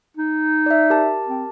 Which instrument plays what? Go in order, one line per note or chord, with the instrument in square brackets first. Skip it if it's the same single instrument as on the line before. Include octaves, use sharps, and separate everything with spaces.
[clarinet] D#4
[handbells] D5 E5
G4 A#4 A5
[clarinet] C4